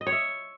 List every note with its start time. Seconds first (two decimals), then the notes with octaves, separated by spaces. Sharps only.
0.01 D#5
0.07 C#5
0.12 E5